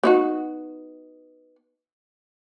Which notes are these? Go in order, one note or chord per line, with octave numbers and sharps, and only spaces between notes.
B3 D#4 F#4